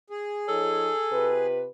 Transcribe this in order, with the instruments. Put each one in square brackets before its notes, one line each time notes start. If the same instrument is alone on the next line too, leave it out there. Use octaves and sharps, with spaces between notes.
[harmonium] G#4
[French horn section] F3 D#4 C#5 [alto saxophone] A4
[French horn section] C3 F4 B4